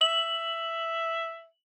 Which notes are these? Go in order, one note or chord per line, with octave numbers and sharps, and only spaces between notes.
E5 F#7